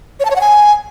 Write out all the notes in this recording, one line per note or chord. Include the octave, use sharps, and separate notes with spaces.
C#5
A5
C#5
F#5
G#5